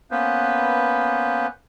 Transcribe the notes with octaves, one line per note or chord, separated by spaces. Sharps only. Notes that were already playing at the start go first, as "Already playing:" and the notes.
A#3 B3 C#4 B4 C5